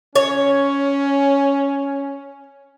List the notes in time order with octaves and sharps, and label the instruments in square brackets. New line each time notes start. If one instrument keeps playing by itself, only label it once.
[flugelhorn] C#4 [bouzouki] C#5